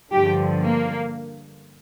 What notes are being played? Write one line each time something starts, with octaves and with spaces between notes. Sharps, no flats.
G2 D3 F3 G4
A#3